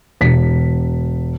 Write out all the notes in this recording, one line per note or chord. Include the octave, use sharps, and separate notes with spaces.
E1 B6